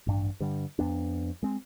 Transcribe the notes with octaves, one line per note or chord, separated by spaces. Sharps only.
A1 G2 D4
G2 D3 G3
F2 B3 D4
G#3 C4